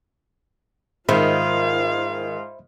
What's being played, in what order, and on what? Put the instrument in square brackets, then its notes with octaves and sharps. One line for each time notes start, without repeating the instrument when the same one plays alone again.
[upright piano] G#2 [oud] D#3 [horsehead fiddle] F4 F5 [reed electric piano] C5 E5 B5